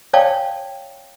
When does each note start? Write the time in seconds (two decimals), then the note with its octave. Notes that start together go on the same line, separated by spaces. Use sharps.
0.13 C#5 D5 F5 G5 A5